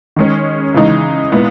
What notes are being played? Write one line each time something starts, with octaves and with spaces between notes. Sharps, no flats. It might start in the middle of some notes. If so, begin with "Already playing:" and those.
D#3 G#3 C#4
C#3 E3 G#3 D#4
A#2 G#3 B3 E4